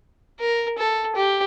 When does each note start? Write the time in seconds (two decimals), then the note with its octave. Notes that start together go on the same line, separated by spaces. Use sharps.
0.40 A#4
0.78 A4
1.16 G4